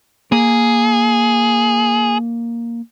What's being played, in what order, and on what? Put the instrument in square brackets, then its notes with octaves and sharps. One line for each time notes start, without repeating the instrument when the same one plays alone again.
[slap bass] A#3 [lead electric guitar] G#4